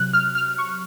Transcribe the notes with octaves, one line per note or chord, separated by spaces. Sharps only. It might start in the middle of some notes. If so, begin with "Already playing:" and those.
Already playing: C3 F#3 F#6
F6
F6
C#6